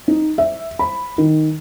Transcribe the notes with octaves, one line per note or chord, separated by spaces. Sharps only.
D#4
E5
B5
D#3